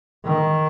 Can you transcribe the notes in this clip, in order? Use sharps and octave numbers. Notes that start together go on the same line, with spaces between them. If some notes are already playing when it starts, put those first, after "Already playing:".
D#3